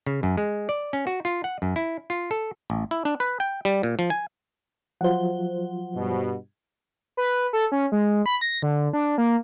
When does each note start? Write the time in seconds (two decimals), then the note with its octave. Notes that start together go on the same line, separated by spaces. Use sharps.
0.06 C#3
0.23 F#2
0.37 G#3
0.69 D5
0.93 C#4
1.07 F#4
1.25 F4
1.44 F#5
1.62 F#2
1.76 E4
2.10 F4
2.31 A4
2.70 A1
2.91 E4
3.05 D4
3.20 B4
3.40 G5
3.65 G3
3.83 A#2
3.99 F3
4.10 G#5
5.01 F3 F#3 F4 C5 F#5
5.96 G2 B2
7.17 B4
7.53 A4
7.72 C#4
7.92 G#3
8.26 B5
8.41 A#6
8.62 D3
8.93 D4
9.18 A#3